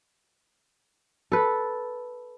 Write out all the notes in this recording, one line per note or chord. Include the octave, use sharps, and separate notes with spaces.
A4 B4